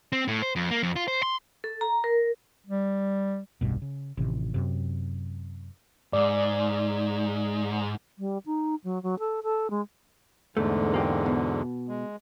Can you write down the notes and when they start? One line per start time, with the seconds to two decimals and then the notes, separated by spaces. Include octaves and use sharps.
0.12 C4
0.28 A2
0.42 C5
0.56 F2
0.71 A#3
0.83 F2
0.96 F4
1.08 C5
1.23 C6
1.64 A4
1.81 A#5
2.04 A#4
2.67 G3
3.61 F1 B1 G2 B2
3.82 C#3
4.17 A1 C3 D#3
4.54 F#2 C3
6.13 G#2 D5
8.19 G3
8.46 D#4
8.84 F#3
9.03 F#3
9.19 A4
9.43 A4
9.70 G#3
10.57 E2 G#2 D3 A3
10.94 A#3 G4
11.26 B2
11.89 G#3